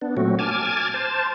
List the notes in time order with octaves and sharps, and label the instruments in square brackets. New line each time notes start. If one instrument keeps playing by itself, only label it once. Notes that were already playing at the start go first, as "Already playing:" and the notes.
[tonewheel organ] B3 D4
A#2 F#3 A3 C4 F#4
G#5 A5 D6 F6 G#6 A6
C5 A5